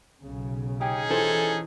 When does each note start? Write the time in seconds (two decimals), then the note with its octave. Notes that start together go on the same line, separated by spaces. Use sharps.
0.22 B1 C#3
0.81 C#4 D#4 G4 G#4
1.10 E3 F4 G4 A4 C5